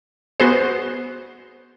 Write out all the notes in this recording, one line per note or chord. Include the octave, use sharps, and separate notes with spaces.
B3 F#4 G#4 C5